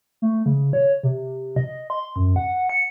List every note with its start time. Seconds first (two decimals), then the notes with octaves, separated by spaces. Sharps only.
0.22 A3
0.46 C#3
0.73 C#5
1.03 C3
1.56 D#5
1.90 C6
2.16 F#2
2.36 F#5
2.69 C#7